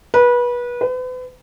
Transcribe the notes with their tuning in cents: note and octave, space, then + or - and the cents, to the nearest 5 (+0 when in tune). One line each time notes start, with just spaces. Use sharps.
B4 -25
B4 +40